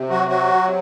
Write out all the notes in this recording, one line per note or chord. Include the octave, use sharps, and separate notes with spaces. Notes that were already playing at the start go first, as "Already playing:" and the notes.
Already playing: C3
F#3 F#4
F#3 F#4
C3